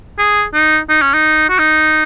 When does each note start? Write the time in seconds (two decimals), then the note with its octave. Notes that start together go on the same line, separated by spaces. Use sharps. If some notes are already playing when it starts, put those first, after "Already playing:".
0.19 G#4
0.54 D#4
0.89 D#4
1.02 C#4
1.14 D#4
1.50 F#4
1.59 D#4